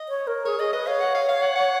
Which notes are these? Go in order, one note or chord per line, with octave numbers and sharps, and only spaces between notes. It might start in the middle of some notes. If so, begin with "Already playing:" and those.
Already playing: D#5
C#5
A#4
G#4 C#5
G#4 D#5
B4 D#5
C#5 F5
F#5
F5
F5
F#5
F#5